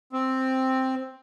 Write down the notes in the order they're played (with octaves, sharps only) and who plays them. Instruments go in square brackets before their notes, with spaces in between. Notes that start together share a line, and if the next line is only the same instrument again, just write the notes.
[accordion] C4